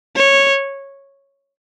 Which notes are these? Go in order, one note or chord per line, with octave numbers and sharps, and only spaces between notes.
C#5